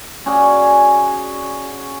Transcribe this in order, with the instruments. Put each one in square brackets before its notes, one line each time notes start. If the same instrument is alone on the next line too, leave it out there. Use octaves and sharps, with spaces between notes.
[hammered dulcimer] C#4 F#4 G#4 D5